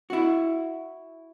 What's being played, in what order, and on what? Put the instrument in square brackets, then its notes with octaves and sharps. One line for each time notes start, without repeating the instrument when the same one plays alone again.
[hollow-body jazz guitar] E4 F#4